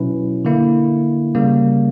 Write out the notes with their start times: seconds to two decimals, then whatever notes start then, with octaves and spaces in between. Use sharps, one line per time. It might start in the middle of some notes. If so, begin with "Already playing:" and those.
Already playing: B2 F#3 C#4 E4 B4
0.45 D3 A#3 E4
1.35 C#3 G3 A#3